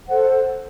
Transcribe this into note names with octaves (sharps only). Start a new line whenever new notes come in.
A4 C5 F#5